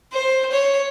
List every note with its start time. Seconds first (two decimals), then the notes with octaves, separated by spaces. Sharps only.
0.12 C5
0.51 C#5